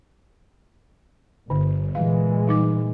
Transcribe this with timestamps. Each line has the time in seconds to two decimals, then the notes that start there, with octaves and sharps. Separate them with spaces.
1.50 G1 D3
1.95 A#2 E3 G#3 F5
2.47 G3 D#4 D6